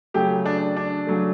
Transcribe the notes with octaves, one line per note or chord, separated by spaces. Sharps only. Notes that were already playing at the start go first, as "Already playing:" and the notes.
C#3 F#3 A3 G4
D4
D4
C#3 F#3 A3